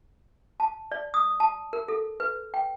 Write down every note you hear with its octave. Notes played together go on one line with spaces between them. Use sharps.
A5
D5
D#6
A5
A#4
A4
B4
G5